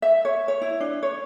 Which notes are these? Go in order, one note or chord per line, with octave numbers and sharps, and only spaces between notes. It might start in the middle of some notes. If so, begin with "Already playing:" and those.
E5
C#5
C#5
E4
D4
C#5